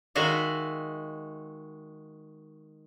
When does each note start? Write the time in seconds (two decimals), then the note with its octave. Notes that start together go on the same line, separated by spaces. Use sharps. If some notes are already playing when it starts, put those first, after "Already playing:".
0.15 D#3 G#3 F#4 E5 F5